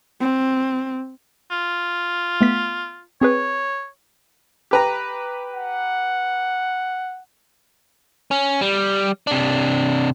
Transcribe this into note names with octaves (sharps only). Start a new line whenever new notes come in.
C4
F4
A3 B3 B6
C4 G#4 B4 C#5
G4 B4 A#5
F#5
C#4
G3
C3 D4